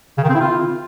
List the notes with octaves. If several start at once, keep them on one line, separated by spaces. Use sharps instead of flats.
C#3
D#3
C4
E4
F4